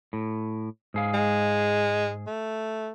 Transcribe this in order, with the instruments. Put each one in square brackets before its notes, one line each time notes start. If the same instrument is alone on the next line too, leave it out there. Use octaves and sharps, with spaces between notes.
[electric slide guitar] A2
G#2 G#4 F5
[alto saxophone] G#3
A3